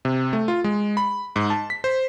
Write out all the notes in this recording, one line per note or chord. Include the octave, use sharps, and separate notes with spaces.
C3
A3
F4
G#3
B5
G#2
A5
B6
C5